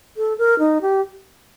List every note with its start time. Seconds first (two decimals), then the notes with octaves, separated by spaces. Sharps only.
0.17 A4
0.38 A#4
0.59 D#4
0.81 G4